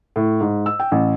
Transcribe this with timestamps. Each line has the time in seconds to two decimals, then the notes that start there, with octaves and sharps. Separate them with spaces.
0.16 A2
0.41 G#2
0.66 E6
0.80 G5
0.91 A1